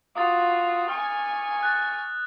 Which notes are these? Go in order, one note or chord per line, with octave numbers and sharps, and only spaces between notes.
F4 F#4 D6 D#6 A6
G#5 C#6 F6
F#6 A6